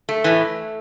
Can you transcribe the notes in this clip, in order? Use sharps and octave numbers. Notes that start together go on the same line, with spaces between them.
A3
A2 E3